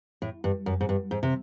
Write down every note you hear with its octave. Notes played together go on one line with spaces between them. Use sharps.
A2
G2
F#2
G#2
G2
G#2
C3